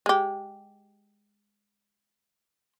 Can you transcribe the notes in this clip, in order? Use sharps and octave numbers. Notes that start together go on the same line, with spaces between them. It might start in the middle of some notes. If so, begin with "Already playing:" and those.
G#3 G4